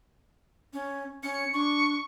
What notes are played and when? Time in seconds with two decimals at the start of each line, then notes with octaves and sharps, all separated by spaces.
0.73 C#4
1.23 C#4 C#7
1.53 D4 C#6